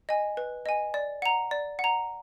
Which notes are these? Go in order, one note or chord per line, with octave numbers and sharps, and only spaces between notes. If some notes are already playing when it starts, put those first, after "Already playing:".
D#5 G#5
B4
D#5 G#5
D5
F#5 A#5
D5
F#5
A#5